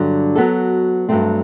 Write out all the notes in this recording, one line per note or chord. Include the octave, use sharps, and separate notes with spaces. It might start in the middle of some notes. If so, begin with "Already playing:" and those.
Already playing: G2 D3 F#3
F#3 B3 F#4 A4
G2 F#3 A3 C4